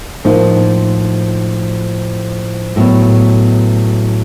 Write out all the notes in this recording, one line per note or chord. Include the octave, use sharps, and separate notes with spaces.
A2 F3 A#3 D#4
A2 F#3 B3